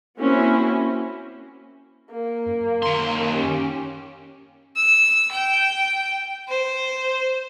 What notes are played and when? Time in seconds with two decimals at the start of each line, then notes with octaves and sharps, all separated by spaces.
0.19 A#3 C4 C#4 E4 F#4
2.11 A#3
2.46 F#2
2.83 D#2 C6
3.31 C#4 G4
4.76 E6
5.31 G5
6.48 C5